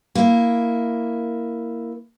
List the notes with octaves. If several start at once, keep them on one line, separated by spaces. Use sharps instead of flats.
A#3 E4